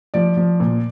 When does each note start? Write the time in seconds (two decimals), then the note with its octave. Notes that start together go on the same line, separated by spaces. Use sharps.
0.14 F3 D5
0.37 F3
0.60 A#2